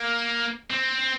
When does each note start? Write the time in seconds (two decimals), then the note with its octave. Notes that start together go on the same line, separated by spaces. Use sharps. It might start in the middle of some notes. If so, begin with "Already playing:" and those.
Already playing: A#3
0.71 C4